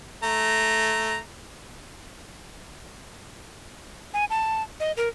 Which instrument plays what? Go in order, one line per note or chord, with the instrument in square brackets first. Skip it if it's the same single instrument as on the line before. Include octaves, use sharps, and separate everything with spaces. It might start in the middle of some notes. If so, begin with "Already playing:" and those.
[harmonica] A3 A#5
[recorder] G#5
A5
D#5
A#4